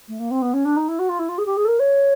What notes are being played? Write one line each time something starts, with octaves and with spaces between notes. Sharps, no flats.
A3
A#3
C4
B3
C#4
D4
D#4
E4
F#4
F4
E4
F4
G#4
G4
G#4
A4
A#4
C#5